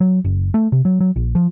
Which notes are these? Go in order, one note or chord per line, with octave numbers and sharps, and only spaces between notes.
F#3
F#1
A3
C3
F#3
F#3
A#1
F3